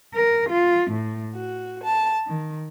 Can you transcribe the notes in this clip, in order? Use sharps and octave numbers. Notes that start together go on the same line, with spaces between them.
A#4
F4
A2
F#4
A5
D#3